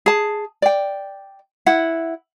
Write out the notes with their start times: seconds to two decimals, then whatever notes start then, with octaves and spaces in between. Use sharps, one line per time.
0.06 G#4 A5
0.62 D5 G5
1.66 E4 F#5